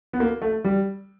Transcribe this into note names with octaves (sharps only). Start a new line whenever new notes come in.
B3
A#3
A3
G3